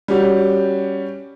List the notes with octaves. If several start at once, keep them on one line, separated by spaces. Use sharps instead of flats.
G3 C#4 F#4 G4